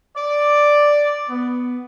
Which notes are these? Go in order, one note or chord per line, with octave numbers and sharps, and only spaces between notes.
D5
B3